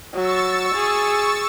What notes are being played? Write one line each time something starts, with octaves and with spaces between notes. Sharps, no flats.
F#3 C#6 E6 A6
G#4